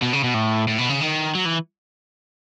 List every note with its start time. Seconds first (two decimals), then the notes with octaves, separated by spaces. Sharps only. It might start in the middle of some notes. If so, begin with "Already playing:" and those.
0.02 B2
0.13 C#3
0.24 B2
0.34 A2
0.68 A2
0.78 B2
0.89 C#3
1.01 D#3
1.35 F#3
1.45 E3